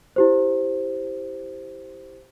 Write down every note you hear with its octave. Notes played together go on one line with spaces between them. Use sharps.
E4 G4 C5